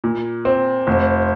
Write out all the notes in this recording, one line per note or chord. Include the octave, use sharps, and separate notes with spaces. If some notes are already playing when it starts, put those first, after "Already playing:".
A#2
C4
F1